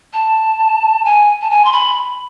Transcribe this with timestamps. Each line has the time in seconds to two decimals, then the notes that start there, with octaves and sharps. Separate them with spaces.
0.13 A5
1.05 G#5
1.42 A5
1.50 G#5
1.65 C6
1.73 B5